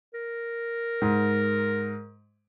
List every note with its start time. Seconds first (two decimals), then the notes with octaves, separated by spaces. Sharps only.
0.14 A#4
1.02 G#2